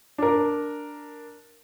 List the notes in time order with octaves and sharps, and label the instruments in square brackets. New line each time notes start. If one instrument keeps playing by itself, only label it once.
[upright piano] D4 A#4